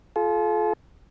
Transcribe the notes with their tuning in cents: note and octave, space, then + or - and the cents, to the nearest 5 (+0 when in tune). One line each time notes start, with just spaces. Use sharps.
F4 +0 A4 -45